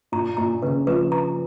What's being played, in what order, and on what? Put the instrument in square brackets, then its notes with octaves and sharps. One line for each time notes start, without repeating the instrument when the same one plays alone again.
[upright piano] A#2 [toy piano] A#5
[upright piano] A#2 [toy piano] A#5
[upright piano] C#3 [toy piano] B4
[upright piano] F3 [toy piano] B4
[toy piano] A#5